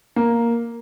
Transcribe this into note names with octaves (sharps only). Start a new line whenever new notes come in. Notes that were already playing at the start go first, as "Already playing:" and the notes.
A#3